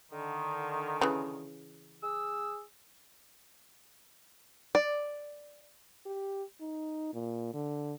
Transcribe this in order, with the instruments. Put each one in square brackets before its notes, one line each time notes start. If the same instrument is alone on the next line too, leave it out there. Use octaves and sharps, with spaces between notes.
[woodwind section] D3 D#3
[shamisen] C#3 E3
[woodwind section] G#4 E6
[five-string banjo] D5
[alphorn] G4
D#4
A#2
D3